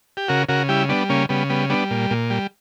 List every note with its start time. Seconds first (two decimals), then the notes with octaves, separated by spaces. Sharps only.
0.17 G4
0.28 C#3 F#4 A#4
0.49 C#3 F#4 A#4
0.69 G3 E4 G4
0.89 G3 B3 D4
1.09 C#3 A#3 C#4
1.29 C#3 G3 B3
1.50 G3 B3
1.70 G3 B3 D4
1.91 A#2
2.10 A#2
2.30 G3